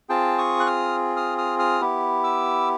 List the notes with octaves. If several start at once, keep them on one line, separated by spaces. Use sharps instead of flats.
C4 F4 G#4 G5 A5
C#6 D#6
F#6
D#6 F6
D#6 F6
D#6 F6
D#6 F6
B3 E4 G4
D6 E6